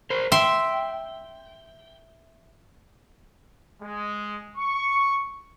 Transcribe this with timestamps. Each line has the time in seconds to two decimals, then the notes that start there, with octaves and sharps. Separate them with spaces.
0.10 A#4 C5
0.32 E5 G5 C6
3.81 G#3
4.57 C#6